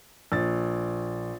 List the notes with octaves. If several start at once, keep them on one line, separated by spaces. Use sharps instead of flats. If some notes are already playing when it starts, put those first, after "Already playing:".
A#1 A6